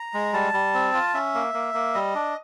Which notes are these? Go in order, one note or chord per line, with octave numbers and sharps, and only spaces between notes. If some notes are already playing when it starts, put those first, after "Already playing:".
Already playing: A#5
G#3
G3 A5
G3
C4
F4
C#4 E5
A#3
A#3
A#3
G3 D#5
D4